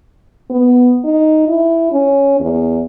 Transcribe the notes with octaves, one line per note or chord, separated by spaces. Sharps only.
B3
D#4
E4
C#4
E2